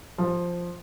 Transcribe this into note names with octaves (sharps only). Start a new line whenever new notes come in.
F3